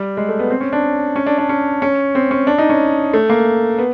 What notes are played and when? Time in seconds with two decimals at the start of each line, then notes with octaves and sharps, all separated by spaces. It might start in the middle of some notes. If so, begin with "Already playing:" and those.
Already playing: G3
0.17 G#3
0.29 A3
0.39 B3
0.50 C4
0.61 C#4
0.73 D4
1.16 C#4
1.26 D4
1.38 D4
1.49 C#4
1.82 C#4
2.15 C4
2.31 C#4
2.47 D4
2.58 D#4
2.70 C#4
3.13 A3
3.30 A#3
3.78 B3